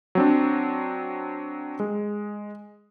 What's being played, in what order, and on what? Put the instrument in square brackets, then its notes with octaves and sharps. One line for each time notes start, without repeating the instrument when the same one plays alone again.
[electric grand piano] F#3 C4 D4
G#3